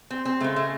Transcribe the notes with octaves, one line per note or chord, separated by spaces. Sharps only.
C4
C4
C#3 G#3 A3
A3